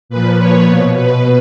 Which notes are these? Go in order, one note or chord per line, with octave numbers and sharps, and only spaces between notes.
A#2 F3 B4
C#5
B2
B4